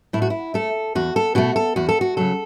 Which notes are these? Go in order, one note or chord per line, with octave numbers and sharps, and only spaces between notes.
A2 E4
F#4
E4
A3 A4
E2 F#4
A4
B2 A3 F#4
A4
E2 F#4
A4
F#4
C#3 F#3 A4